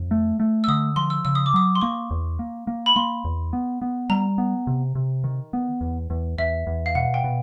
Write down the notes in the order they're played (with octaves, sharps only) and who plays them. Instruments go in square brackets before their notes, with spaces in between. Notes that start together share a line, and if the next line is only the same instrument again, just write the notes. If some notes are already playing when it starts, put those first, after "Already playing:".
Already playing: [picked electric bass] F2
A3
A3
[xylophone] E6
[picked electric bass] D3 [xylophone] D#6
[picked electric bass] F3 [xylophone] C6
[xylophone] E6
[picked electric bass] C#3 [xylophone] E6
[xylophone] D#6
D6
[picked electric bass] F#3 [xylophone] D#6
[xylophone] C6
[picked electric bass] A#3 [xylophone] C#6
[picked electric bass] E2
A#3
A#3
[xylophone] B5
[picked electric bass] A#3 [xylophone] C6
[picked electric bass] E2
B3
B3
[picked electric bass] G3 [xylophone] A#5
[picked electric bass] B3
C3
C3
D#3
B3
E2
E2
[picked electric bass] E2 [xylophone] E5
[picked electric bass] E2
[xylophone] F5
[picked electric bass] B2 [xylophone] F#5
[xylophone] G5
[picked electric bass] B2